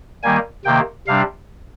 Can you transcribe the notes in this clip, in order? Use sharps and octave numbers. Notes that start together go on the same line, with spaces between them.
D#3 G3 A#3 G#5
C3 D#3 A#3 G5
C3 G3 D4 F5